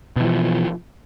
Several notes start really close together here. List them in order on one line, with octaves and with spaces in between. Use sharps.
B2 E3 F3